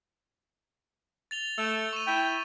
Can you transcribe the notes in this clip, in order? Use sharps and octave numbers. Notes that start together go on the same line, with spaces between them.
A6 F7 G7
A3 E6
C#6 D#7
E4 G5